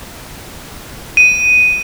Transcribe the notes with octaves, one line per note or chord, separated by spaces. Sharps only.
D#7